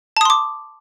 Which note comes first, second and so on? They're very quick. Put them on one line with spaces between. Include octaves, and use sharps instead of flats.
A5 D#6 C6 D6